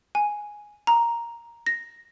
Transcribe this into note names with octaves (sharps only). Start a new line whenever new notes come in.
G#5
A#5
A#6